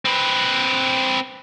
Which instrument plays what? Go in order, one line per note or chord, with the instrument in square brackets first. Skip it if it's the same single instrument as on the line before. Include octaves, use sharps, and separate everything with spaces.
[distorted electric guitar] C4 B4